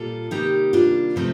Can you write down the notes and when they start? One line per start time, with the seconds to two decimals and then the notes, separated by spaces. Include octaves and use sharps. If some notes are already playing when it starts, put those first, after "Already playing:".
Already playing: A#2 G3 A#3 F4 A4
0.31 C3 D#3 G3 A#3 D#4 G4
0.73 D4 F4
1.16 C3 F3 A3 C4 D#4